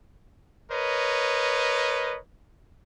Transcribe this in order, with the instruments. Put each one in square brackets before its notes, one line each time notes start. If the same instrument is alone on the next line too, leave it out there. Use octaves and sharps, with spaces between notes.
[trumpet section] A#4 B4 C#5 D#5